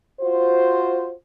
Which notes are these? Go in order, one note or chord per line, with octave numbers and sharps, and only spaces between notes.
F4 F#4 C5